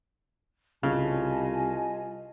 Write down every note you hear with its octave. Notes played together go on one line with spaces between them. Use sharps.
C2 C#3 F4 D#5 G#5 A5